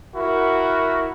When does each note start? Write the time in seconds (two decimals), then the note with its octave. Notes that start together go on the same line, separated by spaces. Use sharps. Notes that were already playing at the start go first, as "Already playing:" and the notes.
0.15 E4 F#4 A#4